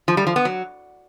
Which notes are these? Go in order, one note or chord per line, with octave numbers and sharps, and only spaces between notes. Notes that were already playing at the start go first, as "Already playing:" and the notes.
F3
G3
F3
B3
F#3